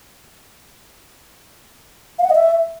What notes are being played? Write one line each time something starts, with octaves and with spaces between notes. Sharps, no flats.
F5
F#5
D#5
E5